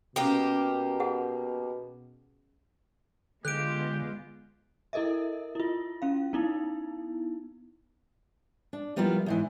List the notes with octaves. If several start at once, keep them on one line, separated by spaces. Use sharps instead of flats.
B2 A#3 C#4 G4 A4
G#4 F#5
D3 G#3 B3 F4 G4 F#6 D7
E4 A4 A#4 D#5 E5
E4 F4
C#4 F5
B3 D#4 E4
D4
F3 G3 A#3 B3 E4 F4
E2 G#2 E3